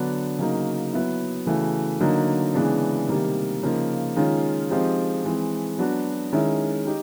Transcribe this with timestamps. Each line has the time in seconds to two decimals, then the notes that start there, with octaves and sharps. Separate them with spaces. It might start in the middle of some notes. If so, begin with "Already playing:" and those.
Already playing: D3 F#3 B3 D4
0.39 C#3 F#3 A#3 D#4
0.93 F#3 B3 E4
1.47 C#3 E3 A3 C#4 F#4
2.00 D3 F#3 A#3 D#4
2.54 C#3 E3 G#3 B3 D4
3.08 C3 D#3 G3 A#3
3.63 C#3 F3 A#3 D#4
4.17 D#3 G#3 C#4 F4
4.70 F3 G#3 C4 D#4 G4
5.24 E3 G#3 C4
5.78 F#3 B3 D4 F#4
6.32 D#3 G#3 C#4 E4
6.86 D#4 G4